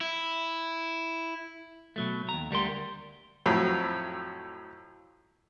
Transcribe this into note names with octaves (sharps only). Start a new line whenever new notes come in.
E4
B2 F#3 A3
D#2 A#5
D2 G3 A#4 C6
F2 A2 F#3